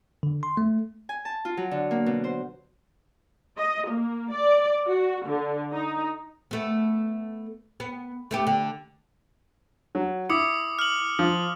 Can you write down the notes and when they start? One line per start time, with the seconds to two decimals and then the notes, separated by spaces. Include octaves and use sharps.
0.23 D3
0.43 C6
0.57 A3
1.09 G#5
1.25 A5
1.45 F4
1.57 F#3
1.71 D3
1.91 A#3
2.06 B2
2.24 C5
3.58 D#5
3.89 A#3
4.32 D5
4.88 F#4
5.27 D3
5.72 D#4
6.51 A3 B3
7.80 B3
8.31 A3 B3 G4
8.47 D3
9.95 F#3
10.29 E4 D6 D#6 C#7
10.79 F6 F#7
11.19 F3